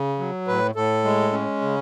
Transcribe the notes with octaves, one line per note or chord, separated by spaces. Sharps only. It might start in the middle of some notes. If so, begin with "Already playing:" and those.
Already playing: C#3
F#3
A2 B4
A2 A4
G#3
C#4
C#3